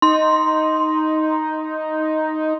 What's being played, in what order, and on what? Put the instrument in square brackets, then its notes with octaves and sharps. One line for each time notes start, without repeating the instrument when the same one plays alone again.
[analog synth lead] D#4 [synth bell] C6